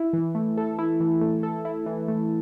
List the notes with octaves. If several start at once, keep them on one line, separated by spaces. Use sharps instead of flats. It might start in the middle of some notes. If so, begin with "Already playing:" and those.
Already playing: E4
E3
A3
A4
E4
E3
A3
A4
E4
E3
A3